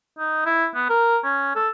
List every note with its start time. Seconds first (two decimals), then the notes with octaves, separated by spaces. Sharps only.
0.18 D#4
0.46 E4
0.75 B3
0.89 A#4
1.24 C#4
1.56 A4